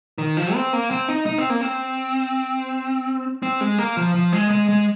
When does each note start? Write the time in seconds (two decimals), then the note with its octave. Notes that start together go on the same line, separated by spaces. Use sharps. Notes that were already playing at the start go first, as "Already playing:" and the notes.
0.18 D#3
0.37 F3
0.54 C4
0.73 A#3
0.91 C4
1.09 D#4
1.26 D#4
1.38 C4
1.50 A#3
1.61 C4
3.43 C4
3.61 G#3
3.78 A#3
3.97 F3
4.15 F3
4.33 G#3
4.51 G#3
4.69 G#3